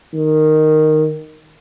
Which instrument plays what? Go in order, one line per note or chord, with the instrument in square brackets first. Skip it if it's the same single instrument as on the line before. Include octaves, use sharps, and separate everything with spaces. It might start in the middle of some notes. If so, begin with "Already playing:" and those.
[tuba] D#3